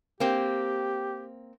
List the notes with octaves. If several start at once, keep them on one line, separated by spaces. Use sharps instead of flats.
A#3 C4 G4